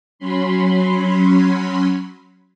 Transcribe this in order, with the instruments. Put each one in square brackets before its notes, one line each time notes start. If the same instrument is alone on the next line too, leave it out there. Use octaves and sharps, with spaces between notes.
[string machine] F#3 C#4 B5 C6